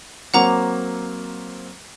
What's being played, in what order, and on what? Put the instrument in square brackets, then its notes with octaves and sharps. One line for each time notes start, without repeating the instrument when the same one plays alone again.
[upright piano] F#3 A#3 C4 [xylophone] F#5 A#5 D6